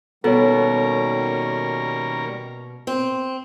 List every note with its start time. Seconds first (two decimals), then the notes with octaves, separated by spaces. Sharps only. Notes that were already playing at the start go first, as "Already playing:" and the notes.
0.24 B2 D#3 G3 A#3 C#4 A4 A#4 C#5
2.87 C4